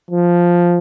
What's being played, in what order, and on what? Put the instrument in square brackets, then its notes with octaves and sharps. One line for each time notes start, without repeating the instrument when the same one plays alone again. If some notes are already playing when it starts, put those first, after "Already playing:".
[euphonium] F3